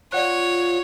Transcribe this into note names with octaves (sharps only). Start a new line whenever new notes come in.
F4 C#5 D5 F#5 F#6